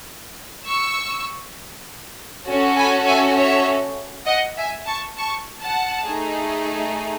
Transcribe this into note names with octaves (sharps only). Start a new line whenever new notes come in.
C#6 E6
C#4 F#4 A4
G#5 B5
E5 G#5
C#5 E5
D#5 F#5
E5 G#5
A5 C#6
A5 C#6
F#5 A5
A3 D#4 G#4